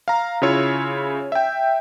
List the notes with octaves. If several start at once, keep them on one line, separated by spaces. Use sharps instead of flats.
F5 A#5
C#3 E4 F4 C#5 E6
E5 G5